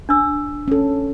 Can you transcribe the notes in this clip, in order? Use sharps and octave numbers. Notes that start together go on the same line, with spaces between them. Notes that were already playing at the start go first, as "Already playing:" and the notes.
D4 E6
C#4 A4